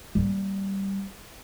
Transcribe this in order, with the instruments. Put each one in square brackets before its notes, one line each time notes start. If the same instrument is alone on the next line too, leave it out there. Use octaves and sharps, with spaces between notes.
[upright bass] G3 A#3